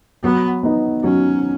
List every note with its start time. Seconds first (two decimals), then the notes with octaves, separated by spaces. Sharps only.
0.23 F#3 B3
0.63 B3 D#4
1.03 F#3 C#4